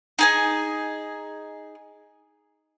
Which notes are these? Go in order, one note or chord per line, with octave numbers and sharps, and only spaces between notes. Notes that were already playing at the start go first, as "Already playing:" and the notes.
D#4 G#4 G#5